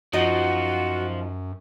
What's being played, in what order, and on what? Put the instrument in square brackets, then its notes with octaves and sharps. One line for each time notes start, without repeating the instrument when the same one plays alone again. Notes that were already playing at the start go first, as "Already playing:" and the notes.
[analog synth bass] F#2 [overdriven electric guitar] F3 [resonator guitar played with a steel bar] D#4 D#5 [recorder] F#4